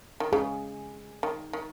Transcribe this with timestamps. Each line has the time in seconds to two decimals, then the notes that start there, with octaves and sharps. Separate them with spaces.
0.20 D#3
0.32 C#3 G#4
1.23 D#3
1.53 D#3